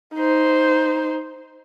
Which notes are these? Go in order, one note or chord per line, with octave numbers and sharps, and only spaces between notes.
D#4 C5